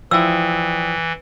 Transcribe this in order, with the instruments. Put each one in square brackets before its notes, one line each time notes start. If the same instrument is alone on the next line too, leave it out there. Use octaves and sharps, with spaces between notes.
[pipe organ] E3 [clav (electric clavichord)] F3 E4 [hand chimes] D5 G5 D#6 [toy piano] E6